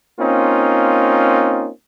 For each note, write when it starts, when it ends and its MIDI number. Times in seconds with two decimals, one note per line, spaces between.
0.19 1.70 58
0.19 1.70 60
0.19 1.70 61
0.19 1.70 63
0.19 1.70 65